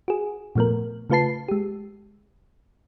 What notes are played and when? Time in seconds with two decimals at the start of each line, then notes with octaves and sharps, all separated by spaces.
0.08 F#4 G#4
0.55 A#2 F3 A3 B3 A#4
1.10 C#3 A3 F4 B4 A5 C7
1.48 G#3 G4